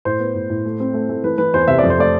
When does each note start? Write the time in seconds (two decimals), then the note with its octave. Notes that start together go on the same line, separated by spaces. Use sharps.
0.05 A2 C5
0.20 B3
0.35 A2
0.50 A2
0.65 A3
0.80 C4
0.94 A3
1.09 A3
1.24 E3 B4
1.38 E3 B4
1.54 E2 C5
1.68 C3 E5
1.78 F2 D5
1.90 C5
1.98 A3 D5